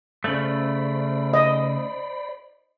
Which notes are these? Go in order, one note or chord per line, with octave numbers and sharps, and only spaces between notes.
C#3 A3 C5 D5 B5
D#5